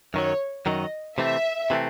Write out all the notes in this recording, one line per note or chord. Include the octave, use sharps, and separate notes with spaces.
F#2 D#3 F#3 C#5
F#2 D#3 F#3 D#5
C3 E3 A3 C4 E5
C3 E3 A3 C4